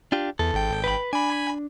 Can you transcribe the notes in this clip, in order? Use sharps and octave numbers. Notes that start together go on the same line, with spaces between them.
D4 F4 G4
E2 A4
G#1 G5
B4 B5
D4 G#5 B5